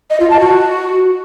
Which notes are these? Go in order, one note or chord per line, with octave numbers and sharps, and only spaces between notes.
D#5
F4
A5
F#4